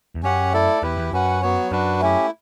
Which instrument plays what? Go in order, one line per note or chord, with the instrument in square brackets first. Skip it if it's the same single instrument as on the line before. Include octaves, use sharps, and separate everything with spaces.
[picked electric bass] E2
[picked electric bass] F#2 [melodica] C#4 G4 C#5 F#5
[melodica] A3 E4 A4 D5
[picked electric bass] E2 [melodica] E4 G4 B4
[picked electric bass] E2
[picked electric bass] F#2 [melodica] C#4 F#4 B4 F#5
[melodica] F#3 B3 F#4 C#5
[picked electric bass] F#2 [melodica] D4 F#4 B4
[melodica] A3 C#4 E4 G4